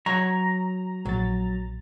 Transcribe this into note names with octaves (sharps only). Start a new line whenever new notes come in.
F#3 C#5 A#5
A#1 F#3 A6